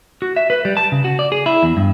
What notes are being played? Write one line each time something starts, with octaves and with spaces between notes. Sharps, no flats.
F#4
E5
B4
G3
A5
C#3
F#4
D5
G#4
E4
E2
G2